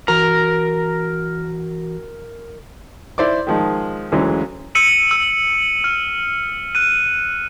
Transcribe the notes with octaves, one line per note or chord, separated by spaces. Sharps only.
E3 F#4 A#4 A#5
E4 C5 D5 D6
D#3 F3 G#3
D2 C#3 E3 F#3 G#3
E6 C#7 D#7 F#7
E6
F6
F#6 D#7